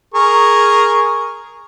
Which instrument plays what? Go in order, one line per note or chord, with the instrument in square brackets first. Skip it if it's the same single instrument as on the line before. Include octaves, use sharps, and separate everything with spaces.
[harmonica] G#4 A#4 C#6